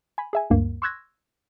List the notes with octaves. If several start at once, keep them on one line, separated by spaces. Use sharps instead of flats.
G#5 B5
G#4 E5 G#5
D2 G2 A#3
C6 C#6 E6 F#6 G#6 A#6